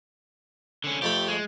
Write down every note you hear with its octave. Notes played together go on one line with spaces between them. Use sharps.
D3 C#4
F2 A3 G4 B5
G#3